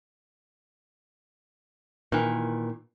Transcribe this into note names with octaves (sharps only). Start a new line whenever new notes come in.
A#2 D#3 E3